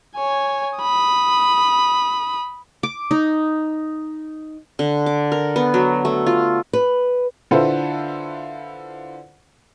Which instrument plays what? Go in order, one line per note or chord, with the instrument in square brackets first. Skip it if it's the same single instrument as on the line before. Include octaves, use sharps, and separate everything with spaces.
[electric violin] C#5 G#5
B5 D#6
[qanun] D6
D#4
D3
D6
A#4
B3
F#3
A3
F4
[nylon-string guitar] B4
[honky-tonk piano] D3 E4 F4 A4 B4 C5